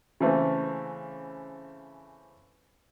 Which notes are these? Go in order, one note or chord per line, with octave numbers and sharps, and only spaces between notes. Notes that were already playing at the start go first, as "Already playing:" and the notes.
C#3 E3 A3 C4